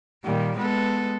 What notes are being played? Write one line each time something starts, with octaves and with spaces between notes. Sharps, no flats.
A#2 D#3 G3 A#3
G#3 B3 A4 B4